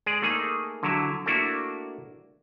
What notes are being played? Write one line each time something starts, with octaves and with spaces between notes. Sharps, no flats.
G#3 G#4 D5
A3 A#3 D#4 G#4
D3 F#3 E4
A3 A#3 D4 E4 F#4